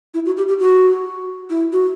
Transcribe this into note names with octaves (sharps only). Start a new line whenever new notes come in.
E4
F#4
G4
G4
F#4
E4
F#4